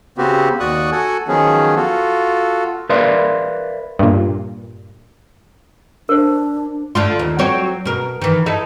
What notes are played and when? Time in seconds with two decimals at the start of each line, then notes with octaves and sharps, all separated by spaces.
0.18 C#3 B3 C4 F#4 G4
0.60 D#2 F#4 D5 C#6 D#6 F#6
0.92 F#4 A4 F#5 G#5
1.28 D#3 F3 F#3 B3 C#4 G#4
1.76 F4 F#4 A4
2.89 A#4 B4 D5 E5 F5 C6
3.99 G2 A#2
6.09 D4 A#4 C5
6.95 D3 A3 F4
7.19 D#2
7.39 F#3 C4 C#5
7.85 B2 A#4
8.22 D#3 E3
8.46 D#4 E4 A4